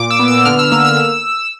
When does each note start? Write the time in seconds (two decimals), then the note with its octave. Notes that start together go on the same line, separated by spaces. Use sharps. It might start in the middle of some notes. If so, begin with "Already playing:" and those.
Already playing: A#2 D6
0.11 E6
0.19 B3
0.28 E6
0.45 D3 F6
0.59 E6
0.72 A#3 E6
0.85 E6